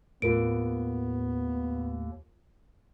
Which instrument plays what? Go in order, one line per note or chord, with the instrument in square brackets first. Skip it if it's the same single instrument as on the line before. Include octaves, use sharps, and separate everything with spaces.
[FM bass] D#2 [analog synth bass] A2 [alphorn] B3 [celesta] F4 A#4 D7